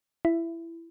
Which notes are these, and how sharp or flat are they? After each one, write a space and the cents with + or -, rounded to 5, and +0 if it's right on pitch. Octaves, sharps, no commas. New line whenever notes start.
E4 +15